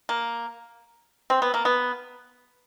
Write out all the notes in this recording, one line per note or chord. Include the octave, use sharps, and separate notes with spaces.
A#3
C4
B3
A#3
B3